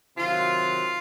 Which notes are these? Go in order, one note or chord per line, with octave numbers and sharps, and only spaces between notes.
C3 D#3 F#3 F4